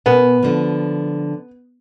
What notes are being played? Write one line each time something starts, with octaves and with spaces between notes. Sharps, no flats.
B2 B3 A#4 G#5
D3 F3